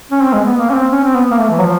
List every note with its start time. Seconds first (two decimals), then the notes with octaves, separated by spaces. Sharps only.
0.11 C#4
0.22 C4
0.33 G#3
0.46 B3
0.57 A#3
0.70 C#4
0.74 C4
0.92 C#4
1.04 C4
1.15 B3
1.31 A#3
1.39 A3
1.50 E3
1.58 F#3
1.62 F3